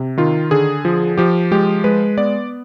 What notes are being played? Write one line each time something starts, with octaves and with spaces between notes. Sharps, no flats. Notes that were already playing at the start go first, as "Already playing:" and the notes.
Already playing: C3
D#3 F4
D3 G#4
F3
F3 G4
G#3 G4
G#3 B4
B3 D5